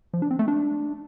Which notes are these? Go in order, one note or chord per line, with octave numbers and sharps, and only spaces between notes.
F3
D4
C4
A3
D4